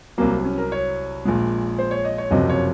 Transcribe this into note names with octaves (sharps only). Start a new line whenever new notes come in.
C2 C3 F#3 A#3
C#4
A#4
C#5
A#1 A#2 G#3
C5
C#5
D#5
C#5
F#1 F2 C3 F#3 D#5
C#5